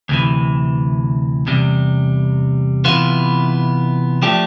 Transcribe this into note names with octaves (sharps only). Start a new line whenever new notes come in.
D2 C3 E3
E2 C3 G3
C3 E3 B3 F4
F3 A3 D4 G4